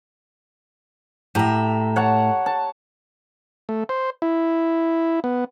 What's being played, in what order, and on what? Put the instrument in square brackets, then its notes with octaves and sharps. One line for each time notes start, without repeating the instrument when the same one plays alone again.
[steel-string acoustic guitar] A2 E5 [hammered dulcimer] G4 A#5
[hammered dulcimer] C#5 F#5 A5
A5
[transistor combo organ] A3
C5
E4
B3